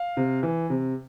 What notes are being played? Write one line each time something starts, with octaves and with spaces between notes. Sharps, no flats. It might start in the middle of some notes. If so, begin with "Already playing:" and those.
Already playing: F5
C3
E3
C3